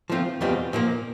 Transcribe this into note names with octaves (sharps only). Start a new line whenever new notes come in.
F3 A3 C4 F4
E2 B2 G3 C4 F4
A#2 F3 A#3